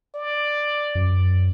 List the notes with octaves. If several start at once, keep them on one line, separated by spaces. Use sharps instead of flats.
D5
F#2